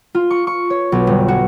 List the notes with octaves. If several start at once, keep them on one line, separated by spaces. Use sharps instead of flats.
F4
C#6
C#6
C#5
B1
G1
F#4